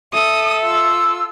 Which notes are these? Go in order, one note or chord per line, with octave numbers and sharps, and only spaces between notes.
A4 E5 D#6
F4 E6